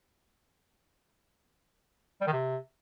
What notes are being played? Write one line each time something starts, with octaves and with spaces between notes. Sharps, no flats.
G3
D#3
C3